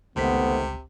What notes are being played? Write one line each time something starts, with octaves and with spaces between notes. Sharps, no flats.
G1 C#2 C3 D#3 A3 B3 C5 B6